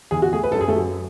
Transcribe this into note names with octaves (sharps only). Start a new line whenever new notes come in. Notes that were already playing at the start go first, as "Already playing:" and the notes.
E2 G#4
F#4
A3 G#4
B4
F#2 A4
G#4
A3 A4
F#3